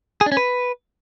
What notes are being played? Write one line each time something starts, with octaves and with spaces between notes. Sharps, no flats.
G#4
D4
C#4
B4